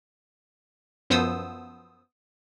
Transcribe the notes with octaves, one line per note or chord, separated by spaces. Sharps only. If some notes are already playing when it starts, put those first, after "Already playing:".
F#2 F3 B3 C5 D#6 E6